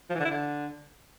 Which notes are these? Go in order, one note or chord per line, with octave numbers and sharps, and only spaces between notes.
F3
E3
D3
E4
D3